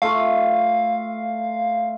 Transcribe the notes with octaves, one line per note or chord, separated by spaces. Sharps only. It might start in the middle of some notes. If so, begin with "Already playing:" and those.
A3 F4 F5